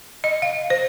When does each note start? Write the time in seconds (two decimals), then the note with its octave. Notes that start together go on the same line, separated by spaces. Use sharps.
0.24 D#5
0.42 F5
0.70 C5